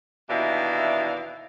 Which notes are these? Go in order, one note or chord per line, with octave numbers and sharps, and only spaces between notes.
D#2 B2 E3 D4 E4 F5